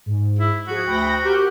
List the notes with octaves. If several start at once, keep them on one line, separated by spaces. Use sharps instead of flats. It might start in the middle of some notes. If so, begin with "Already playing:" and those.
G#2
E4
F3 F#4 G#4
D2 G5 B5 A#6
G4 A#4